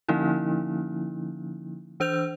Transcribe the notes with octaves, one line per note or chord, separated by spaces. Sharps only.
D3 F3 A#3 C#4 D#4 E4
E3 D4 C5 E6 G6 F7